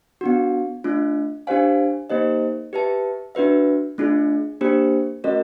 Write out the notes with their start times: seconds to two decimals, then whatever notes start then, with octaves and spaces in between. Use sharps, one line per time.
0.21 B3 D4 F#4
0.84 A3 D4 F4
1.47 D4 G4 C5 F5 G#5
2.10 A#3 D#4 G4 C5 D#5
2.73 G4 B4 E5 A5
3.35 D4 F#4 B4 E5
3.98 A3 D4 F4 G#4
4.61 A#3 D4 G4 C5
5.24 A3 C#4 F#4 A#4 D#5